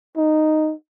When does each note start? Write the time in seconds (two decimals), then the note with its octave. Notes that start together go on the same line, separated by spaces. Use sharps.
0.17 D#4